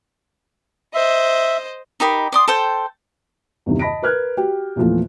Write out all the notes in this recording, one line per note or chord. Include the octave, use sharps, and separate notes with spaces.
C5 D#5 E5
D#4 G4 A#4 B5
D5 C6 D#6
A4 C5 G5
E2 G2 C3 D#3
D#5 A5 B5 A#6 B6 D7
A#4 B4 F6 F#6 G#6
F#4 G4 G5
E2 A#2 E3 F3 A3